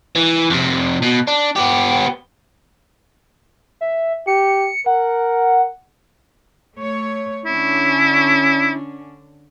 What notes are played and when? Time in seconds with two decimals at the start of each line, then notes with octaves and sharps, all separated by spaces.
0.16 E3
0.50 F2 C3
1.02 B2
1.28 D4
1.56 B3 G4
3.81 E5
4.27 G4 C#7
4.86 A#4 F#5
6.77 A3 C#5
7.45 D3 C#4 D4 E4